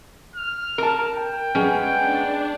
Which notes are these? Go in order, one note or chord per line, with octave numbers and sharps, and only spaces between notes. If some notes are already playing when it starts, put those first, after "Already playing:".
F6
A#4 A5
G5
G#3 B3 C#4
D4